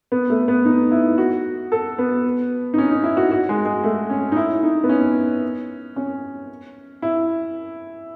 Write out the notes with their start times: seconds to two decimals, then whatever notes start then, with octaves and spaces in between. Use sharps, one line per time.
0.12 B3
0.30 A3
0.48 B3
0.65 D#4
0.91 E4
1.18 F#4
1.72 A4
1.99 B3
2.74 D#4
2.78 C#4
2.91 D#4
3.04 E4
3.17 F#4
3.31 F#4
3.49 G#3
3.66 G#3
3.83 A3
4.10 C#4
4.32 D#4
4.36 E4
4.63 D#4
4.84 B3
4.89 C#4
5.96 C#4
7.02 E4